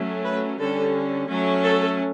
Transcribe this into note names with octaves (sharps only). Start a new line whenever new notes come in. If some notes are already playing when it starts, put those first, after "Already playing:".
Already playing: F#3 A3 C#4
B4
D3 G3 C#4 A4
F#3 A3 C#4
A4